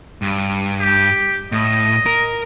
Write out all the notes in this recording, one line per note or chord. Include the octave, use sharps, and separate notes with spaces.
G2
G4
A2 D#5
A#4